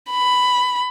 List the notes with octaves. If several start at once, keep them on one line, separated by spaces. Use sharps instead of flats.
B5